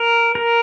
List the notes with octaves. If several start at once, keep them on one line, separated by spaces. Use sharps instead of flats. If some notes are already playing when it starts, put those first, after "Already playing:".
Already playing: A#4
A#4